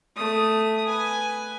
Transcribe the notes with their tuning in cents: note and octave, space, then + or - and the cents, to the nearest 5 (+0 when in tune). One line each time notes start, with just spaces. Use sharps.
A3 +0 D#6 +0
B4 +0 G#5 +0